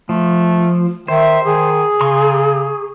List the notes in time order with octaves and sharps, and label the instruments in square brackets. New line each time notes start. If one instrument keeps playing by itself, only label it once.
[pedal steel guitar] F3 [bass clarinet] A3
[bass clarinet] D#3 [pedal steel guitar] C5 [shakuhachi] E5
[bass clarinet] D#3 [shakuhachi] G#4
[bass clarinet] C#3 [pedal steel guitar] A#5 C6 C#6